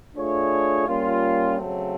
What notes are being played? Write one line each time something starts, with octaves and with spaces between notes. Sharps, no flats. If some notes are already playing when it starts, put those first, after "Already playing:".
A3 D4 F4 G#4 C#5
G3 A#3 C#4 F4
C#3 F#3 A3 C4